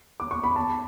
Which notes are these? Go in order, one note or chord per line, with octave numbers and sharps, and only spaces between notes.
D6
C#6
B5
A5